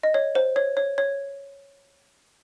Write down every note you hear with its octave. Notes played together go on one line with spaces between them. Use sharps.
D#5
C#5
C5
C#5
C#5
C#5